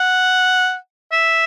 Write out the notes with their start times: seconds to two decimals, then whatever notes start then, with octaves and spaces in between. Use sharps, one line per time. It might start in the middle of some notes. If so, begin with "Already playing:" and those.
Already playing: F#5
1.11 E5